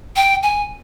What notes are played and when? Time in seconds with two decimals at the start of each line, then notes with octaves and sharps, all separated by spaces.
0.16 G5
0.43 G#5